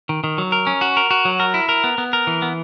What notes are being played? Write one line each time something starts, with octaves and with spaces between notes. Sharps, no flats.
D#3
D#3
F#3
A#4
C#4
F#4
A#4
F#4
F#3
A#4
E4
A#4
B3
B3
A#4
E3
B3